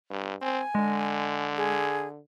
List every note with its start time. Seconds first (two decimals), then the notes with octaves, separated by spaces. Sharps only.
0.11 G2
0.42 C4 G#5
0.75 D3 G#3
1.57 G#4